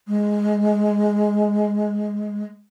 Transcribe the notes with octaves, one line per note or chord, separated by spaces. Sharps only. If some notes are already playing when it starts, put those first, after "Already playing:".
G#3